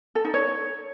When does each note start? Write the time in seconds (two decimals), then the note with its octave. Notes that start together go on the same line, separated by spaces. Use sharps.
0.15 A4
0.25 D#4
0.34 C#5